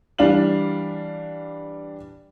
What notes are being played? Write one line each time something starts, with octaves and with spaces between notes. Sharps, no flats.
E3 G3 D4 F5 F#7